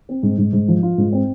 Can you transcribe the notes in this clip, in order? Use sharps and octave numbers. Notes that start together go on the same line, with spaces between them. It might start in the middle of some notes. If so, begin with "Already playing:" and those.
C4
G#2
G#2
G#2
F3
F4
G#2
C4